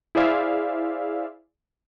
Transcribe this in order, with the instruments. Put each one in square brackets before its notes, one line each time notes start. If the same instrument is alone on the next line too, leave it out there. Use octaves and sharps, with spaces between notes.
[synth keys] E4 G#4 C5 D5 E5 F5